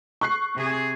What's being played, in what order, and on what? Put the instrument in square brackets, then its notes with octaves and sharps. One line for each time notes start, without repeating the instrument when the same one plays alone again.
[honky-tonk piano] C#6 F#6 C7
[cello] C3 G#4